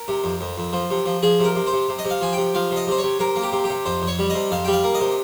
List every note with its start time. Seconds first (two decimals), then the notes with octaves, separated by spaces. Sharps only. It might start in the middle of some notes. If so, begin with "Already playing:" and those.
Already playing: A#4
0.08 C3
0.24 F2
0.41 F2
0.58 F2
0.73 F3
0.90 C3
1.06 F3
1.23 F3 G#4
1.40 C3 A#4
1.55 C3
1.67 C5
1.72 C3
1.89 C3
1.99 D#5
2.05 C3
2.10 F5
2.21 F3 G#5
2.33 C3 G5
2.54 F3 F5
2.71 C3
2.76 D#5
2.88 C3 C5
2.98 C3 C#5
3.19 C3 A#4
3.36 A#3
3.42 G4
3.52 C3
3.64 G4
3.69 C3
3.86 F2 C5
4.02 F2
4.07 C#5
4.19 G3
4.30 C3 D#5
4.51 F2 F5
4.65 G3 G5
4.73 F5
4.84 A#3
4.95 D#5
5.01 C3